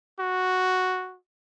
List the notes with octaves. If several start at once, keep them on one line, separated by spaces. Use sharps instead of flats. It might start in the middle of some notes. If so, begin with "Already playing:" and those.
F#4